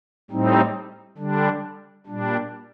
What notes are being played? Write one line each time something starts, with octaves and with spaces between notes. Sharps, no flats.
A2 G3 C4 D#4
D3 G3 D4
A#2 G3 D4